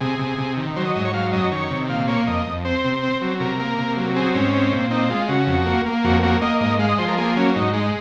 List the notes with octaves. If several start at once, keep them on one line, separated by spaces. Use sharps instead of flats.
C3 G#4
C3
C3
D#3
F#3 C5
D#5
G#2 D#5
C#5
F#3 F5
F#2 D#5
D#3 C#5
C3
A#2 F5
A#3 C#5
F2 D#5
F2
C4 C5
C3
C4
F#3
C3 A#4
A#3
C3
F#3
C4 G#4
G#2 C#4
C4
A#2
C4 D#4
G#3 F4
C#3 F#4
F2
A#3
A#3
F2 F#4
A#3 F#4
A#3 D#5
G#2 D#5
G#3 F5
D#5
F3 C5
A#4
A#3 G#4
F#3 C#4
G#2 D#4
G#3 D#4